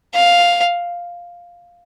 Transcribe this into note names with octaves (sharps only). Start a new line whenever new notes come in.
F5